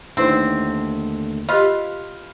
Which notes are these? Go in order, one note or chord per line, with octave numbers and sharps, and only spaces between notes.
D#2 D3 A3 C4 D#4 E4 B4
F4 G4 B4 D#5 F6